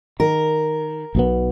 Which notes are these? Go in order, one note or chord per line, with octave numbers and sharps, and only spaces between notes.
D#3 A#4
B1 B2 B3